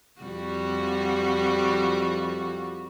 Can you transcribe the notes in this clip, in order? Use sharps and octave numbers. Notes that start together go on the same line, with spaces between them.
F2 G3 F#4